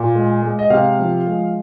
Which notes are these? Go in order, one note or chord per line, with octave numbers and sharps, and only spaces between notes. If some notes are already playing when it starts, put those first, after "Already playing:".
Already playing: A#2
G#3
G#3
D#5
C3 F5
F3
G#3